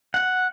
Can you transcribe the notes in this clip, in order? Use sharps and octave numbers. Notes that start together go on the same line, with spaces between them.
F#5